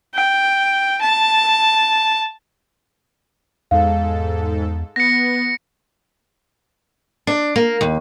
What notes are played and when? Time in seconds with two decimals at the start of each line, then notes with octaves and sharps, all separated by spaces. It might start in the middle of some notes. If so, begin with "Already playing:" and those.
0.15 G5
1.01 A5
3.71 E2 G#2 A4 F5
4.96 B3 A#6 C#7
7.27 D4
7.56 A#3
7.81 D#2